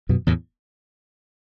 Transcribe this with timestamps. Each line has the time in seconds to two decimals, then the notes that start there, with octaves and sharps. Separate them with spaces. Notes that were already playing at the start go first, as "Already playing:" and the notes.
0.09 F#2 B2
0.27 E2 A2